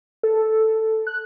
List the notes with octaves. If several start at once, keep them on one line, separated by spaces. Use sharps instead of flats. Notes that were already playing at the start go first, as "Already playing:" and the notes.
A4
F#6